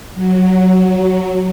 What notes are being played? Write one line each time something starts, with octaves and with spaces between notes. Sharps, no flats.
F#3